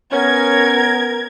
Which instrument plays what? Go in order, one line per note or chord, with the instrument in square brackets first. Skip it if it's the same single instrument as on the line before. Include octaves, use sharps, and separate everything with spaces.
[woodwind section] B3 A#4 [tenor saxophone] C#4 [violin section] G#6